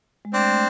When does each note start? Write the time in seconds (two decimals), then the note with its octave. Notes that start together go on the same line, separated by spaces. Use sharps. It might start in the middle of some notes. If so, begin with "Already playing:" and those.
0.25 G#3
0.33 A3 C4 D4
0.51 A3